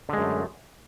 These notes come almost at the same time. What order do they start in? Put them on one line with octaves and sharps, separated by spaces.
D3 G#3 F#2 A3